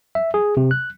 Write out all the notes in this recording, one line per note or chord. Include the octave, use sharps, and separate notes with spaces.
E5
G#4
C3
F#6